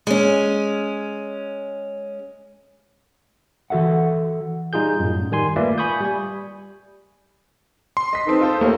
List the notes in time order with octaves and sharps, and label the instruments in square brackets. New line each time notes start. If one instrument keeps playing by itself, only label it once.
[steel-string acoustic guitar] G#3 C#4
[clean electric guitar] E3 F#4 A4 E5 F#5
[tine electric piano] G3 D#4 F4 G#4 G6
F#2 A2
D#3 G3 G#5 C6
A3 A#3 F4 B4 D5 E5
G#5 B5 C#6 D#6 G6
G3 G#5
[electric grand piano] C6
[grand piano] D#5 B6
[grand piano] C4 A4 B4 [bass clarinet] D#4
[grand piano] F4 A4 C5
[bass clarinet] D#2 [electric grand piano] A3 [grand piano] A#3